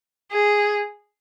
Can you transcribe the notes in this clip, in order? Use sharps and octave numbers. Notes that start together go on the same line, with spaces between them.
G#4